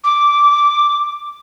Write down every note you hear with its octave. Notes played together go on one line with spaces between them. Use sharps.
D6